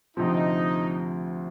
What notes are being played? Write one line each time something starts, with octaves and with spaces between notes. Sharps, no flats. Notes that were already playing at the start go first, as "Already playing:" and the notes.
D2 C3 F3 C4 D#4